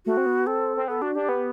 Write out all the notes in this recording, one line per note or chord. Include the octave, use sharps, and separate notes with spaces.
A3 F#4
C4
B3
C4 A4
C4
B3 A4
D4 F#4
D4 G4
B3